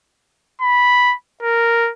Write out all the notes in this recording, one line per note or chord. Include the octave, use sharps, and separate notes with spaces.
B5
A#4